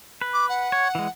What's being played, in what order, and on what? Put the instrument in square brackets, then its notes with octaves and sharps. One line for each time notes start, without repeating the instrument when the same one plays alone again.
[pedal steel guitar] B4
[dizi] D6
F#5
[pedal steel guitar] C#5
E3 G#3